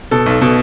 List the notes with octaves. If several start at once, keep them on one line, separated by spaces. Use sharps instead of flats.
B2 A4
B1
B2